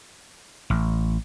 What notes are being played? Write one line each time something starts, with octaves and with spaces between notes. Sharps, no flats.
A1